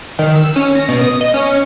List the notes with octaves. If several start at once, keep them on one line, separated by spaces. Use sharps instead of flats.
D#3
E6
C#4
A#6
B2
D#6
D#5
C#4